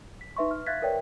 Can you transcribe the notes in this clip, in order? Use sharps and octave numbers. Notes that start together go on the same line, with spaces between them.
B6
D#4 B4 E5 C6 C#6
F6
E5 F5 F#6 G#6 A6 B6
A#4 B4 C#5 D5 E5 G5